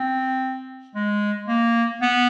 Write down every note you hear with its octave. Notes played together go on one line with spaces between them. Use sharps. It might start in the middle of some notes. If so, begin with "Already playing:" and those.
Already playing: C4
G#3
A#3
B3